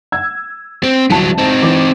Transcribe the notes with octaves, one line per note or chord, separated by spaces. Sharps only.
E6 G#6
C4
C2 E3 F#3 A5
C4 D#4
E3 D6